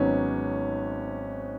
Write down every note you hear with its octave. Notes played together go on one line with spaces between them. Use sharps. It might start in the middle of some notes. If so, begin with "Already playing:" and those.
Already playing: G#1 G#2 F#3 B3 C#4 D#4